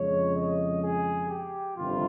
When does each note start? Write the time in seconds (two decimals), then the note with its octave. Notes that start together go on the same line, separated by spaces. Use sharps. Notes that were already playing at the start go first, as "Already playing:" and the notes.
Already playing: F2 C#3 G#3 C#5
0.36 D#5
0.83 G#4
1.29 G4
1.77 G1 F2 C3 D#3 G3 F4